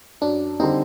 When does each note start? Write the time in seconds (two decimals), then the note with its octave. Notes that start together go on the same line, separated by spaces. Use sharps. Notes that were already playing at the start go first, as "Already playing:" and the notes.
0.21 F#2 D4
0.60 D3 G3 C4 D#4